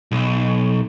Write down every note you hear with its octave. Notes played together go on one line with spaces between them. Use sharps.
B1